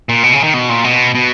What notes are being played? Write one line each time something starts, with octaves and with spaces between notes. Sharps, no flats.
A#2
B2
C#3
D#3
B2
A#2
B2
B2